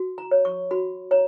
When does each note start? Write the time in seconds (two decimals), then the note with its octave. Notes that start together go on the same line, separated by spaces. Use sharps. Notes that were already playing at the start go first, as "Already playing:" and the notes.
Already playing: F#4
0.18 A#5
0.31 C#5
0.45 C#6
0.71 F#4 B5
1.11 C#5 A#5